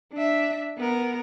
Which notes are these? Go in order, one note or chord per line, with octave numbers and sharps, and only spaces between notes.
D4 E5
B3 A#4